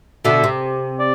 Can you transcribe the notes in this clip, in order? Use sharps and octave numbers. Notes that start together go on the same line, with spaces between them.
B2 D3 E5
C3
D5